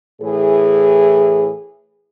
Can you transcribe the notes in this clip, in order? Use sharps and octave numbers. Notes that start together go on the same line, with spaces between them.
A2 E3 G#4